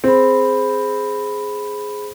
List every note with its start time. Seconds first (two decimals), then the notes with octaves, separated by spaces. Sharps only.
0.04 C4 G#4 B5